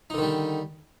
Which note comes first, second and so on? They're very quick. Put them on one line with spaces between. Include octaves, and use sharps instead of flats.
D#4 D3 D#3 G3